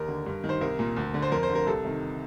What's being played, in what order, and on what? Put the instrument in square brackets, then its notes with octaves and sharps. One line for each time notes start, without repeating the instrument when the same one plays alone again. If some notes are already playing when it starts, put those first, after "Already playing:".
Already playing: [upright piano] D#2 A#4
D3
G2
D#3
C5
C2 A#4
A#2
D2
D3
C5
F2 A#4
C5
D3
A#4
C2 A4
C3 D#3